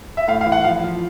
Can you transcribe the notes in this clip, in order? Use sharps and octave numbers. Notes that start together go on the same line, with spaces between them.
E5
A2 F5
F5
E3
F#5
F3 F5
F3